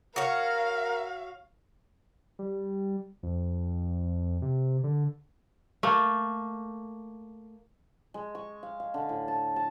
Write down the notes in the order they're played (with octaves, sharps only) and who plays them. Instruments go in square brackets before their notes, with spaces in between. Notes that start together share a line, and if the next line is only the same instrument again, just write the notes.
[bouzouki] F#4 C#5 [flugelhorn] A#4 [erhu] F5
[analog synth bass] G3
F2
C3
D3
[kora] A3 A#3
[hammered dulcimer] G#3
C#6
F5
F5
D3
A2
A5
A5